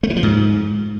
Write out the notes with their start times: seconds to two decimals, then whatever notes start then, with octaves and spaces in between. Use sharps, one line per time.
0.03 A3
0.10 E3
0.16 F3
0.23 G#2